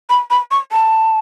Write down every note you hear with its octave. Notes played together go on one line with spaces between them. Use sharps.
B5
B5
C#6
A5